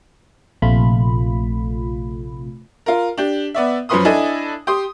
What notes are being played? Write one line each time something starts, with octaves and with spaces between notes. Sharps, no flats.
A#1 C3 A3 F4 B5
F4 A#4
D4 G4
B3 D5 E5
F#2 F3 C#4 B4 C6 D#6
D4 E4 A4 D#5 G#5
G4 C6 D#6